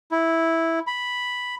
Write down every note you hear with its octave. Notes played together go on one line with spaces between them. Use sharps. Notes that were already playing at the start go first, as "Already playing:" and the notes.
E4
B5